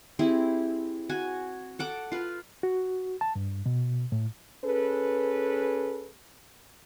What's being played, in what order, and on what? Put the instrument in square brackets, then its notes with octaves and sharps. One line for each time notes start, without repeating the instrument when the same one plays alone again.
[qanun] C4 E4 G4 G#4
F#4 G#5
A4 F#5 D6
F4 B4
[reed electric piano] F#4
A5
G2
B2
A2
[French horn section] C#4 G#4 A4 B4